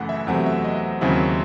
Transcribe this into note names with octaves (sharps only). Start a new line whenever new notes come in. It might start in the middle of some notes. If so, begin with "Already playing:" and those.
Already playing: F#2 C#3 E3 A3 F#5 F#6
E5
E2 C3 F#3 A3 C4 F#5
E5
D#5
D#2 C#3 F#3 C4 E4